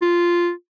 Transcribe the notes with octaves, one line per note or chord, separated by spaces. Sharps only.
F4